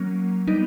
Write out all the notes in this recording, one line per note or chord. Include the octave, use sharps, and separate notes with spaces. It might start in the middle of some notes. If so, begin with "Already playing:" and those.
Already playing: F#3 A#3 C#4
G3 B3 D4 D#4